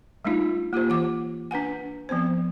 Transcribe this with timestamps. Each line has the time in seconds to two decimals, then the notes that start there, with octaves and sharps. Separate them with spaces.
0.25 G3 A3 D4 D#4 F4
0.73 A#3 F4 G4 C5
0.89 E3 F#5 D6
1.51 D4 B4 F#5 G#5
2.09 F3 B3 C4 C5